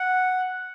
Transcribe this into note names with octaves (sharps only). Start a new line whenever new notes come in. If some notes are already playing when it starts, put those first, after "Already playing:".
Already playing: F#5